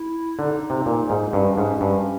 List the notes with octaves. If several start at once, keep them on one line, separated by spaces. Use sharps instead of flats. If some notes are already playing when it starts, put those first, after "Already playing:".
Already playing: E4
D3 D#4
C3
A#2
G#2
G2 C#4
C#4
G#2 D4
C#4
G2 C#4